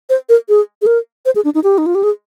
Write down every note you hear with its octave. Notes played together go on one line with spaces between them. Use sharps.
C5
A#4
G#4
G#4
A#4
C5
G#4
D4
D#4
G4
D#4
F4
G4
G#4